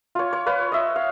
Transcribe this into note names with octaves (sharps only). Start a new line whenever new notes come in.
F4 C#5
C#5
B4 C#5 F5
D#5 E5
F5